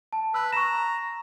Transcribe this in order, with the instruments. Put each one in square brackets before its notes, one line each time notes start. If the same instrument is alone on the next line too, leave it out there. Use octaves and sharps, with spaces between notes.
[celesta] A5
[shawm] B4 [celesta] E6 F#6
[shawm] A#5 [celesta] C#6 E7